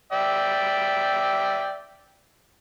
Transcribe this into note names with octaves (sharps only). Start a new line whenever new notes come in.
D5 E5 G5